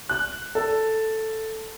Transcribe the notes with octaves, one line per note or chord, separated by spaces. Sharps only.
F#6
A4